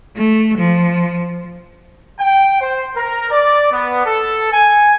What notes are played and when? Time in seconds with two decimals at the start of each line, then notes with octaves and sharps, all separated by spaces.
0.16 A3
0.57 F3
2.19 G5
2.60 C5
2.95 A#4
3.31 D5
3.71 B3
4.06 A4
4.52 G#5